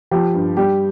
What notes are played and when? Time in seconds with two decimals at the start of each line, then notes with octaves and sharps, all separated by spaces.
0.11 F3 G4
0.34 G2
0.57 G3 G4